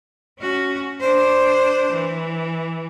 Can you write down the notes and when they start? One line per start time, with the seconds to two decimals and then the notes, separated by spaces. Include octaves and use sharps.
0.39 C#4 F#4
1.00 D4 C5
1.92 E3